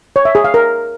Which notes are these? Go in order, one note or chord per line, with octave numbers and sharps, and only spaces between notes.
C#5
E5
G#4
F5
A#4